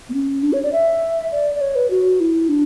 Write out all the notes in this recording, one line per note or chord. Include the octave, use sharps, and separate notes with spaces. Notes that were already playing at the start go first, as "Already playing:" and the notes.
B3
C#4
D4
C#5
D5
E5
D5
D5
C#5
B4
F#4
E4
D4